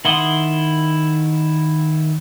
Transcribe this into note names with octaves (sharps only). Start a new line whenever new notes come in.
D#3 E4 F#5 C6 D#6